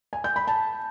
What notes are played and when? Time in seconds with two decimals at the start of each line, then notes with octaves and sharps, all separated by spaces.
0.13 G#5
0.24 G6
0.36 B5
0.47 A5